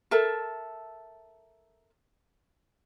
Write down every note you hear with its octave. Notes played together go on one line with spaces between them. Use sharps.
A4 A#4 E5 A5